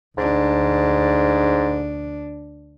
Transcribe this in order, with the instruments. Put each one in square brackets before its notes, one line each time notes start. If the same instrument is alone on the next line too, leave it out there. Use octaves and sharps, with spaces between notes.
[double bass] D2 D4 [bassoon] G#2